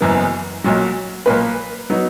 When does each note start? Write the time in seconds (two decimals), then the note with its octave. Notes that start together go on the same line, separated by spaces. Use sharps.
0.01 F#1 F#2 E3 B3
0.64 B1 A#2 F#3
1.26 B1 A#2 A#3 B4
1.90 F#3 B3 D#4